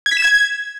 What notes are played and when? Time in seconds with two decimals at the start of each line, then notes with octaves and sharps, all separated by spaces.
0.06 G#6
0.11 B6
0.17 E7
0.22 G#6